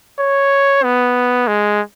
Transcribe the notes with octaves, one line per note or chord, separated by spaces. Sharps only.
C#5
B3
G#3